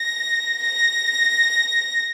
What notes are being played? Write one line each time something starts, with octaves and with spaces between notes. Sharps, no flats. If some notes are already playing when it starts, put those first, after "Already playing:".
Already playing: A#6
A#6